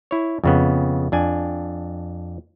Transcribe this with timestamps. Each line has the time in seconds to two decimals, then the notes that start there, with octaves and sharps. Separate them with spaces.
0.11 E4 C#5
0.44 F2 C#3 B3
1.12 F2 D4 G#5